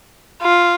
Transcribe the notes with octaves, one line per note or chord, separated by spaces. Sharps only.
F4